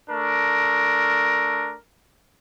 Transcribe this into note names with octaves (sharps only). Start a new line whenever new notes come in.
A3 D4 A#4